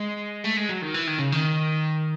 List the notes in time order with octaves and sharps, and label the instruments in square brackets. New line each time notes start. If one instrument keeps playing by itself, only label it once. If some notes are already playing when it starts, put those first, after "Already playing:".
Already playing: [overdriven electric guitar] G#3
A3
G#3
F#3
D#3
E3
D#3
C#3
D#3